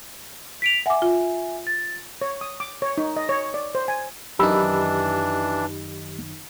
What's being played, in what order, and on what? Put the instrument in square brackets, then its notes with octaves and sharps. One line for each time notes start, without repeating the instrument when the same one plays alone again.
[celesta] B6 D7 F7
[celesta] E5 G#5 [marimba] F#5 D6
[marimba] F4
[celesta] A6
[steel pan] C#5
D#6
D6
C#5
D#4
D#5
C#5
D5
C5
G#5
[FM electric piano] F#2 D#3 D#4 [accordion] E3 D4 [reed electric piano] G4 B5 E6